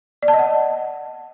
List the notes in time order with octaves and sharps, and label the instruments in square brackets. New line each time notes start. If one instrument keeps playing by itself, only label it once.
[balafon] D5
A5
D#5
F#5